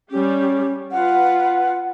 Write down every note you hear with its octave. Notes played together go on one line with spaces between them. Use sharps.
G3 C#4 G4
F4 B4 F#5